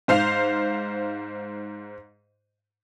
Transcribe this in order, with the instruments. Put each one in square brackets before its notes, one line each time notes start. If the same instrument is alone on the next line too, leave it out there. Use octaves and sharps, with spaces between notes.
[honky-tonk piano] G#2 C5 F5 C7 F7